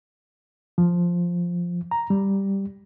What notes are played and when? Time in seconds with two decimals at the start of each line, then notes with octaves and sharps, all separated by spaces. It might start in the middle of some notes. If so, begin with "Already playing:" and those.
0.78 F3
1.91 A#5
2.10 G3